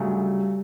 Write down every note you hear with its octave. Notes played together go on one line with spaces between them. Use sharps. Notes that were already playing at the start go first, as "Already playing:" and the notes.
Already playing: D2 C#3 F#3 G3 A3